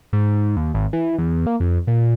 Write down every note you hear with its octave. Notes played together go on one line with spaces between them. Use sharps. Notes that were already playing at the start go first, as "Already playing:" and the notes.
G#2
D#2
G#1
E3
E2
A#3
F2
A#2